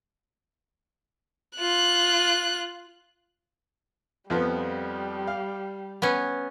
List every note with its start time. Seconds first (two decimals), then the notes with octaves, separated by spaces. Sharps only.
1.58 F4 F#6
4.30 F2 F3 G3 B3
5.27 F5
6.02 B3 C#4